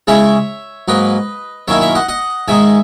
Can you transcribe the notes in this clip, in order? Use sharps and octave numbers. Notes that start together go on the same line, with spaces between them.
C#3 G#3 C#4 E4 C#5 E5
G#2 F#3 A#3 B4 D#5
F#2 D#3 A#3 C#4 E4 C#5 E5
C#5 E5
D#5 F#5
D#5 F#5
G#2 D#3 G#3 D#4 E5 G#5